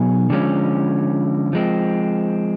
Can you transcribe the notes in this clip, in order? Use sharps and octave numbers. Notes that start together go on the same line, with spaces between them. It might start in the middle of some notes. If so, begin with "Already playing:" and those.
Already playing: B2 F#3 B3 D#4 G#4
D3 F3 G#3 C#4
F3 G#3 C4